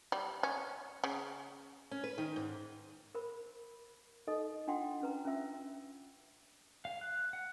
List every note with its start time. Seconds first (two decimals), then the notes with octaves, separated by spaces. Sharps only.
0.12 G3
0.43 C#4
1.04 C#3
1.91 C#4
2.04 B4
2.18 D#3
2.36 G#2
3.15 A#4 C5 B5
4.27 D#4 A4 D#5
4.67 D4 F4 F#5 G5 C6
5.02 C#4 B4 A#5
5.25 C#4 F4 E5 E6
6.85 F5
7.01 F#6
7.33 F#5